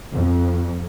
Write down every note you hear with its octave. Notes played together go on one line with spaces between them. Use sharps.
F2